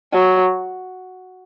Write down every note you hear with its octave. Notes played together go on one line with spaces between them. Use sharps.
F#3